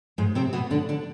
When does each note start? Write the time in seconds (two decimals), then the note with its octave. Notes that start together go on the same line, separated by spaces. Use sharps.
0.18 G#2 G#3
0.35 C3 C4
0.53 B2 B3
0.71 D3 D4
0.89 D3 D4